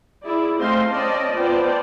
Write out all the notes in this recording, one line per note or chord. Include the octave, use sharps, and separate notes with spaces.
E4 G#4 D5
A3 C4 C5 D#5 F5 C6
C4 C#4 D5 D#5 A5
B3 F4 C5 D5 G5 A5